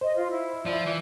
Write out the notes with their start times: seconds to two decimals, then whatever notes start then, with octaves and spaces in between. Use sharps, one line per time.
0.01 C5 D#5
0.16 F4
0.32 E4
0.66 F3 D5 E5
0.86 E3